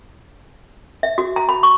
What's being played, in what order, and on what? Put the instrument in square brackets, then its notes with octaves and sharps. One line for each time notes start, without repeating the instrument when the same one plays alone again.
[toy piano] E5
F#4
A#5
B5
C#6